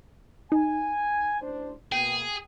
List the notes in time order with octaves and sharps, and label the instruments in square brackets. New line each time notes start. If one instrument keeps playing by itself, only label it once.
[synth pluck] D#4 [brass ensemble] G#5
[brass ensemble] A1 D4 C5
[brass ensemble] B2 A#3 B3 [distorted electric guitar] G#4 [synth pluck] G5